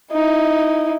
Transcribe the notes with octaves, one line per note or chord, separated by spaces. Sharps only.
D#4 E4